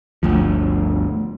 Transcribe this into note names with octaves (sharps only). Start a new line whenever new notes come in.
G1 D2 F3